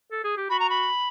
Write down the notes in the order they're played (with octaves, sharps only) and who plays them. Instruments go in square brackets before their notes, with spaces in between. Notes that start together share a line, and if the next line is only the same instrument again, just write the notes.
[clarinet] A4
G#4
G4
[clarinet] F#4 [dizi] B5
[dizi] A#5
B5